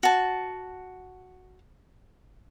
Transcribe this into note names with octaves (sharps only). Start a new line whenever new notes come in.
F#4 A5